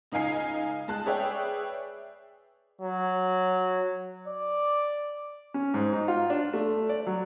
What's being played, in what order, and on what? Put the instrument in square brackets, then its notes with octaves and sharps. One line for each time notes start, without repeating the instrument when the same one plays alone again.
[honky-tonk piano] C#2 D#4 F5 G#5 C7
G#3 A5 F#6
G#4 B4 C#5 D5 E5 G5
[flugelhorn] F#3
D5
[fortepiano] C#4
G#2
D#4
F4
D4
A3
D5
F#3